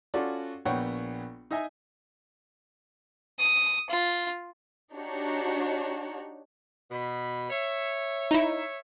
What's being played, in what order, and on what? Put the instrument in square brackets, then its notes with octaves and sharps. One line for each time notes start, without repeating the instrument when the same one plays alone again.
[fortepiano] C#4 F4 F#4 A4 D5
A#1 B3 C#5 F#5 G5 C#6
D#4 D#5 E5 G#5
[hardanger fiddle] D#6
F4
[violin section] D4 D#4 F#4 G4 C#5
[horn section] B2 B5
C#5 E5
[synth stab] D#4 E4